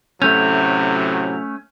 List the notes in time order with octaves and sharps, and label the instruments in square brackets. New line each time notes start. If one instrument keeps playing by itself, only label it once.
[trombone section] A2 C3 F#3 [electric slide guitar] A3 C#4 [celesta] G6 F7